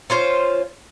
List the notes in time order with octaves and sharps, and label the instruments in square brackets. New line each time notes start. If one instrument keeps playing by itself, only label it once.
[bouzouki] C#4 F4 C5